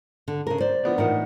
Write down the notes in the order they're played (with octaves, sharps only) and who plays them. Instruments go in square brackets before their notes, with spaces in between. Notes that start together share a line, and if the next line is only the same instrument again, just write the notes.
[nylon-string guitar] D3
C#3 A#4
C5 D5
[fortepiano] F3 B3 D4
[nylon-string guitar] A2 E3 F#5 [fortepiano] D#4 A#4